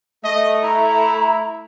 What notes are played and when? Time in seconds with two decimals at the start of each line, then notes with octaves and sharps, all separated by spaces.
0.24 A3 D#5
0.63 E4 A#5